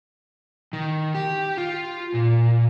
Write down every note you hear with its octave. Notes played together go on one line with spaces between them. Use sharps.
D#3
G4
F4
A#2